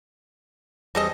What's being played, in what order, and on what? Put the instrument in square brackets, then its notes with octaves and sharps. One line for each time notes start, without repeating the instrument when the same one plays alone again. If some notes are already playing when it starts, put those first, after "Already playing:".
[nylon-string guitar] E2 G3 G#4 [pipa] C4 A4 D#5